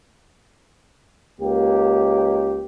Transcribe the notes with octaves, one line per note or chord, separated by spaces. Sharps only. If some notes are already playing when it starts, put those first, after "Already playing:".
C#2 A#3 G4